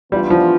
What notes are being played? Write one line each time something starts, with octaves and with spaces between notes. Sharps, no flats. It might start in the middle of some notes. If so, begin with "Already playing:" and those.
E3 G3 B3 D4 F4
F3